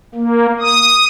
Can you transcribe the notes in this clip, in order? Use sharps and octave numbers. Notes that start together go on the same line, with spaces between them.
A#3
D#6